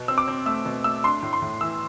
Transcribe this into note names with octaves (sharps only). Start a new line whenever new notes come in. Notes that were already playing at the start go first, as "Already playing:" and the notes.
Already playing: B2
C4 E6
D6
C4
A3 E6
B2
A3 E6
D4 C6
A2
C6
A2
E3 E6